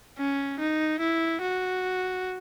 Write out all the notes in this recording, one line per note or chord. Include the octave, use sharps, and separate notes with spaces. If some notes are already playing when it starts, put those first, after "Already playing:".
C#4
D#4
E4
F#4